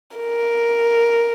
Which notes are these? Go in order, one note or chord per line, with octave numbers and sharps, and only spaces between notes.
A#4